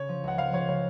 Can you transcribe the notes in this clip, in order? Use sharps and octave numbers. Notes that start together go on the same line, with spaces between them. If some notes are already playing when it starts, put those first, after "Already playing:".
Already playing: C#3 C#5
F3
C#2 F#5
F3 F5
F3 C#5
C#3 C#5